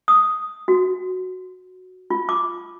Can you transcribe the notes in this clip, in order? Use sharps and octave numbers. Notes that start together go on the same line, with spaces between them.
D#6
F#4
F4
D6